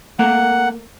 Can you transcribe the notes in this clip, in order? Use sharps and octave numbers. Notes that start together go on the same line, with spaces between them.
A3 A#3 A#4 F#5